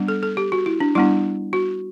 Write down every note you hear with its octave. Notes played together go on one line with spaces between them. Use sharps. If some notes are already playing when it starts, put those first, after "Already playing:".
Already playing: G3 B3 D4
A4
A4
G4
F#4
E4
D4
G3 B3 D4 E4
F#4